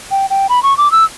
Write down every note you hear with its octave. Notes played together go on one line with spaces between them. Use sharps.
G5
G5
B5
C#6
D6
E6